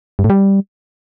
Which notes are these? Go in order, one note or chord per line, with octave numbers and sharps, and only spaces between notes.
G2
A2
G3